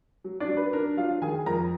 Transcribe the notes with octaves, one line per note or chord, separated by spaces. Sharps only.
F#3
D4 D5
F#3
B4
D4 A#4
F#3 F4 F5
D#3 G#4 G#5
F2 A#4 A#5